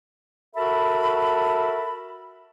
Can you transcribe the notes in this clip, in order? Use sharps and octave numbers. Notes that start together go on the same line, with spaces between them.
F#4 A4 A#4 E5 A5 B5